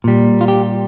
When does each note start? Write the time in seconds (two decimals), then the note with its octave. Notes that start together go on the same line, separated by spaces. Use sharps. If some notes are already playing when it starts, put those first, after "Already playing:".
0.04 A#2 G3
0.41 F4
0.48 G4